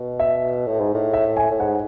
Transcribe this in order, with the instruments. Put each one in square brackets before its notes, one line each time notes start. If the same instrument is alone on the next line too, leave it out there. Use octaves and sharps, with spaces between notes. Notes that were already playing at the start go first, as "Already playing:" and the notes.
Already playing: [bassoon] B2
[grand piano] E5
[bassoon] A2
G#2
A2
[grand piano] E5
G#5
[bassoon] A2
[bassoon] G#2 [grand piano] F#5